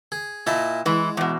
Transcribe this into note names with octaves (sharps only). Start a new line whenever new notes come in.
G#4
A#2 E4 D#5 A5
E3 G#3 E4
E2 B2